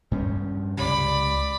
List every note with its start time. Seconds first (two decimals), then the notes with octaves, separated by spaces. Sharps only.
0.11 G2 C#4
0.77 C#2 C3 D5 B5